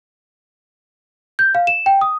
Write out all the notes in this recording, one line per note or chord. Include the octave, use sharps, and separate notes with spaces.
G6
F5
E7
G5
D#6